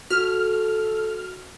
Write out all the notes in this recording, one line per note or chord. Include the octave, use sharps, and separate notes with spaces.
F#4 A4 F6